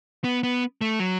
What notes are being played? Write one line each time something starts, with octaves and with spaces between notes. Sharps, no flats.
B3
B3
A3
F#3